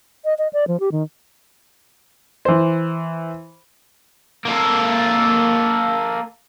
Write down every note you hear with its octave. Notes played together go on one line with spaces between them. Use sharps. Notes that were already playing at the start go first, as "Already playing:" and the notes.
D#5
D#5
D5
F3
G4
D#3
E3 C5
A#3 A4